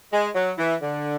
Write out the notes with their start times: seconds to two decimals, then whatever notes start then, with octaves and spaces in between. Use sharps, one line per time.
0.12 G#3
0.35 F#3
0.58 E3
0.82 D3